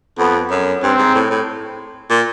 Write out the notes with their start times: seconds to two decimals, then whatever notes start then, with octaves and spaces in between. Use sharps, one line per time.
0.19 F2 B3
0.51 F#2
0.83 G2 C4
0.99 G#2
1.15 A2
1.30 A2
2.10 A#2